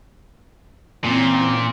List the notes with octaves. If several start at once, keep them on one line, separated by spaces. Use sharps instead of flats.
A#2 E3 C4 C#4